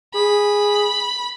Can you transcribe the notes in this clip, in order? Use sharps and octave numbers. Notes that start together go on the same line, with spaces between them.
G#4 B5